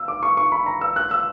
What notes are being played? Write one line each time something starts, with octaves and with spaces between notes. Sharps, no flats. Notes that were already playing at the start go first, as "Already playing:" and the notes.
Already playing: E6
D6
C#6
C#6
B5
A#5
E6
F#6
E6